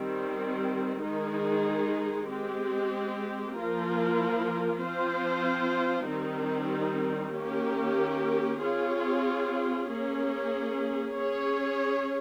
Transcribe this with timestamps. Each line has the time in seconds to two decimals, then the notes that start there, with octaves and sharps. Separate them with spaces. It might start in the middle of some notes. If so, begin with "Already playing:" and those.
Already playing: D#3 G3 C4
1.03 D#3 G#3 D#4 G#4
2.29 G#3 C4 G4
3.56 F3 A#3 F4 A#4
4.82 F3 C4 F4 C5
6.08 D#3 G3 C4 D#4
7.35 D#3 A#3 C#4 G4 A#4
8.61 C4 F4 G#4 C#5
9.88 A#3 C#4 G#4
11.14 C#4 G#4 C#5